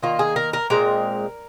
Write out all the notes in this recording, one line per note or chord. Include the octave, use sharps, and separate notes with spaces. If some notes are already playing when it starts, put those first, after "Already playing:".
D#3 A#3 F4
G#4
A#4
A#4
A#2 G#3 C4 A#4